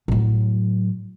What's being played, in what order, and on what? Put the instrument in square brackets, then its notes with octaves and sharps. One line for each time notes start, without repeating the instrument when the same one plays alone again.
[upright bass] A2 F#3